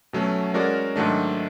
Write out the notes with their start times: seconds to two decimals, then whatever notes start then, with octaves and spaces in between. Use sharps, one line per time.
0.13 B2 F#3 A3 C#4
0.54 G#3 C#4 F#4 A#4 D5
0.96 G#2 D#3 F#3 A3 D4